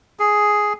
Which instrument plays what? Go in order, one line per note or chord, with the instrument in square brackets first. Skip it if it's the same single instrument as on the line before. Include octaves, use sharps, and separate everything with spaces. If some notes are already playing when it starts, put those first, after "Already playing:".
[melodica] G#4